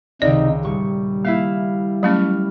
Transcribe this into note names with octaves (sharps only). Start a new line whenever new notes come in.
C#2 C3 D#3 D#4 D5
D#1 G3 C#6
A#3 E4 E5 F5
F#3 A3 C#4 B5 C#6 F6